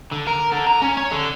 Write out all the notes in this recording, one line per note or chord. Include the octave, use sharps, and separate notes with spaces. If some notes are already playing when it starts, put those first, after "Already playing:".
D3
A#4
D3
A#5
C#4
C#5
D3